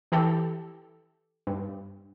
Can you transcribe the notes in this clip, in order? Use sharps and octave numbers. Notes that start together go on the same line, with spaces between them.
E3 G4 A4
G2